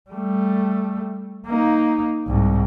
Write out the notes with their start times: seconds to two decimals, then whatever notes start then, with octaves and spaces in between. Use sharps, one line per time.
0.10 G3 A3
1.47 A#3 D#4
2.28 C2 G#2